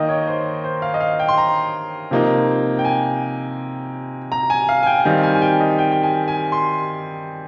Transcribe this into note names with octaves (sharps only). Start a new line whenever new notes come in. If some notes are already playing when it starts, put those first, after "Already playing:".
Already playing: D#3 A#3 D#4 D#5 G5
C#5
C5
C5
F5
D#5
F5
G5
C6
A#5
C3 F3 A#3 D#4
G5
G#5
A#5
G#5
F5
G#5
G5
D#3 G3 C4 D#4 F5
G#5
G#5
G5
D#5
G5
G5
G#5
G#5
C6